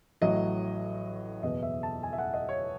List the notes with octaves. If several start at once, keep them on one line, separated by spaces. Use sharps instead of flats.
A1 A2 F#3 A3 D#5
F#1 E2 B2 D#5
E5
A5
G#5
E5
F#5
D#5
C#5